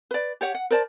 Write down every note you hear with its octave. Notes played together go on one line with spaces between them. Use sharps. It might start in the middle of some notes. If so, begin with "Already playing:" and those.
B4 D5
G4 C#5 F#5
F#5
A#4 C5 D5 A5